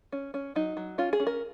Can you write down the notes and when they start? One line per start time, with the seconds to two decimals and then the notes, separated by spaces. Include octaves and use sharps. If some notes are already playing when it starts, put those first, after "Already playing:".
0.12 C#4
0.34 C#4
0.56 F#3 D#4
0.77 F#3
0.98 C#4 F4
1.13 G#4
1.20 C#4
1.27 A#4